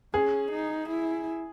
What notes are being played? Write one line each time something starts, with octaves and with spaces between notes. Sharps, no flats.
C#4 G#4
D#4
E4